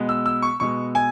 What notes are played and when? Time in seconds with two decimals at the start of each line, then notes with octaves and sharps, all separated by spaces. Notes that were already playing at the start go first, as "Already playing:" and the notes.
Already playing: B2 G#3 B3
0.09 E6
0.26 E6
0.42 C#6
0.60 B2 G#3 B3 C#6
0.95 G#5